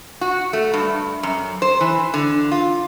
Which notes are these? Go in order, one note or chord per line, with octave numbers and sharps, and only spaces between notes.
F#4
A3
G2
F#2
C5
E3
D3
F4